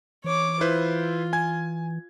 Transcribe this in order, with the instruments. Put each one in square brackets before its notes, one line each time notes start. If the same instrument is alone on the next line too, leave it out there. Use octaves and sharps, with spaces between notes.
[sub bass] E3 [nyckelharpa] C#5 D6
[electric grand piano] E4 B4 C5 [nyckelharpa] F4
[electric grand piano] G#5 G#6